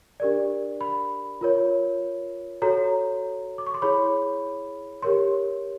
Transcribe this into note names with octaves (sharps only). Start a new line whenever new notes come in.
D4 G4 A#4 D5
B5
F4 A#4 C#5
F#4 A4 C#5 A#5
D6
C#6
C6
E4 G#4 C#5 B5
G4 A#4 C#5 C6